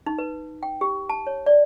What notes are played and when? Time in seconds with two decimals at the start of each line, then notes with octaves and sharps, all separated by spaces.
0.06 D#4
0.18 B4
0.63 G5
0.81 G4
1.10 A5
1.27 C#5
1.46 D5